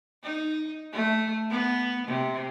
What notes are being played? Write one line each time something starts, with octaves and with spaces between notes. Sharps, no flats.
D#4
A3
B3
C3